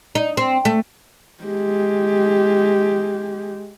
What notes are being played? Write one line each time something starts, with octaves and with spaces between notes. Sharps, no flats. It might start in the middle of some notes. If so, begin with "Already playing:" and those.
D#4
C4
A3
G#3 G4